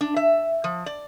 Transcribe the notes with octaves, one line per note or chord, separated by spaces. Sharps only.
D4
E5
F3
D5